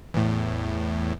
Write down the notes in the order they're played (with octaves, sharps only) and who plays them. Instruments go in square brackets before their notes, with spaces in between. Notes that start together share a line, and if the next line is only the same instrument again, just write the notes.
[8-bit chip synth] E2 A2